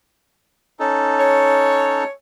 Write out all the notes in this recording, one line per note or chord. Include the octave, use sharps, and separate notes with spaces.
C#4 D#4 A4
C#5